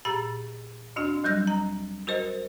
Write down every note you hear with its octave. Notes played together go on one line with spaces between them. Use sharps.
A#2 G4 A#5 A6
D2 D4 F#4
D2 F#3 G3 E6 A#6
A#5
F#4 A#4 C5 D#5